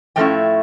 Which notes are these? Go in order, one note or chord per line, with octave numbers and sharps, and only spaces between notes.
A2 F3 A3 C#4 E4 G5